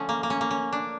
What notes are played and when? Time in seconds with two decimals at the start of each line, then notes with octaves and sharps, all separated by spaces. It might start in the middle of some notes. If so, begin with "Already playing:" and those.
Already playing: D3 F3 A3 C#4
0.09 A#3
0.23 A#3
0.30 C#4
0.41 A#3
0.51 C#4
0.73 D4